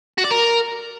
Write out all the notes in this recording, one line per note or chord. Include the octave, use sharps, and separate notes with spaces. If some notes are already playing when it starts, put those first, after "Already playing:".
F#4
D5
A#4